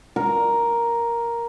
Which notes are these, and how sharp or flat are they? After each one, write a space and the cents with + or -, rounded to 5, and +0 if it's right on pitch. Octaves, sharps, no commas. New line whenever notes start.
A#4 +5